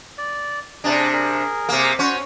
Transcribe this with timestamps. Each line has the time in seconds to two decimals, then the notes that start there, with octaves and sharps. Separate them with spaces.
0.18 D5
0.84 C3 D4 G#4 A5 A#5
1.13 G#4 A#4
1.69 C3 A#3
1.99 C#4 F#4 C5